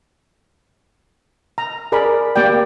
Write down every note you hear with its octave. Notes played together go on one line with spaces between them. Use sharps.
A#5
G#4 A#4 D5 B5
A#3 G4 D5 G5